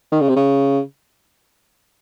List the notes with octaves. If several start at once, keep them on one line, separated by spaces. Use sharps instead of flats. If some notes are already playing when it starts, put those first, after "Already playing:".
D#3
C#3
C3
C#3